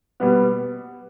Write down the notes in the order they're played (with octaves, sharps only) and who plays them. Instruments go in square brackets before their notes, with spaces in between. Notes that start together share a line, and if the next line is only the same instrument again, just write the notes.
[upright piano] B2 G3 B3